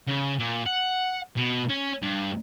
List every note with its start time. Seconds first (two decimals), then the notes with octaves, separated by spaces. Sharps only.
0.07 C#3
0.40 A#2
0.67 F#5
1.37 B2
1.69 C#4
2.02 G2